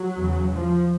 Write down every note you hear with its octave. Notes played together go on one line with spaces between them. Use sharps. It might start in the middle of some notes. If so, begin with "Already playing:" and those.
Already playing: F#3
E2 C#3
F3